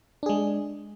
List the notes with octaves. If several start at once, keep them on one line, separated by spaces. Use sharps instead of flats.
G#3 D4 G#4